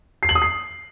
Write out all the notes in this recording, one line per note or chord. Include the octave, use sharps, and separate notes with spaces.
C7
F#7
D#6
C7